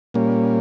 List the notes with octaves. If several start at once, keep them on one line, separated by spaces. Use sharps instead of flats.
A#2 G3 A#3 C#4